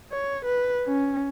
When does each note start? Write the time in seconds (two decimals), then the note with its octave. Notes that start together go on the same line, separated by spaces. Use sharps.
0.12 C#5
0.45 B4
0.87 C#4